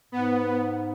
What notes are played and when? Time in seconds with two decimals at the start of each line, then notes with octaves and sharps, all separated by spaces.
0.12 G#2 B3